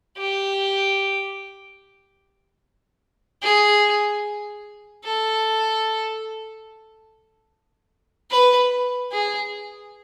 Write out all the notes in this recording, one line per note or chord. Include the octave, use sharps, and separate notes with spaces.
G4
G#4
A4
B4
G#4